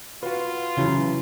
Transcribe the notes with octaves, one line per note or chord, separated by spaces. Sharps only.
F4 F#4 B4
C#3 E3 F#3